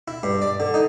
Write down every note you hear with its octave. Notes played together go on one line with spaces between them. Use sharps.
E4
G2
D5
D3
D#4